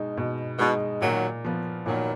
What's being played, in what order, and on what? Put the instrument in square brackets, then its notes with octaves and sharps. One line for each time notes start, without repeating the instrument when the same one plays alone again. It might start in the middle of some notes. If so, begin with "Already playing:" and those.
Already playing: [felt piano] B2 G#3 D#4
B2
[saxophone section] B2 [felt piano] G#3 D#4
[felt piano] A#2 [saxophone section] D#3 F#3
[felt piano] F3 B3
[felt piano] A#2 [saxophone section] D#3 F#3